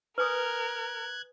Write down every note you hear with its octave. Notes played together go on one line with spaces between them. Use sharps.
A#4 B4 G#5 D#6 F#6 G#6